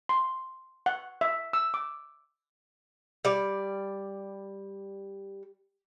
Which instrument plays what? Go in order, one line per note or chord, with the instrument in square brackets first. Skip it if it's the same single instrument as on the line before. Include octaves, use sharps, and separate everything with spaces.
[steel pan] C6
F#5
E5
E6
D6
[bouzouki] G3 D5